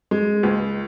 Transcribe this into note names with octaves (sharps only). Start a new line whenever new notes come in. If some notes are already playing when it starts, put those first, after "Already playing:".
G#3
C#2